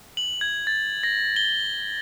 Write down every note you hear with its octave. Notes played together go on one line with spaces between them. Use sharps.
F#7
G#6
A6
A#6
G7